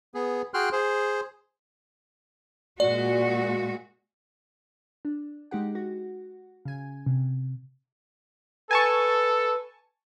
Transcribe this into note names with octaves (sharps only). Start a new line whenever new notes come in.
B3 G#4
F#4 G#4 G5 C6 F6 F#6
G#4 C5
A#2 G#3 F#4 D5
D4
G#3 D#4 G4 F#5
F#4
C#3 G#5
C3
A4 B4 G#5 A5 C#6